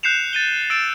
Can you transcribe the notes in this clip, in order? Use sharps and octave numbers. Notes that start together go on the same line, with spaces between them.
F#6 G6 C7 C#7 E7 F7
A6 D#7 G7
E6 A6 D7 E7